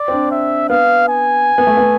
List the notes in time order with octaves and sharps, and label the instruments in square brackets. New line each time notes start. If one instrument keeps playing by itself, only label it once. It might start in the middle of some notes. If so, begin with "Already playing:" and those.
Already playing: [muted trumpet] D5
[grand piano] C4
D4
[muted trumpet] E5
[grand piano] B3 [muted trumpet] F5
[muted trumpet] G#5
[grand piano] B3
A3
B3